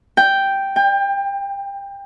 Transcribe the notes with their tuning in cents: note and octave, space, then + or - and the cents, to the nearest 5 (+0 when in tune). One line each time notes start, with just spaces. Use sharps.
G5 +0
G5 +25